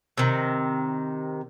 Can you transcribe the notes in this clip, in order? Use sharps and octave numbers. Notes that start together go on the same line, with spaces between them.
C3 D#3